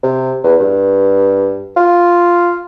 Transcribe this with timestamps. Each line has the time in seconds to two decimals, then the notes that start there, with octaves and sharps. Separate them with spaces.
0.03 C3
0.44 E2
0.60 G2
1.77 F4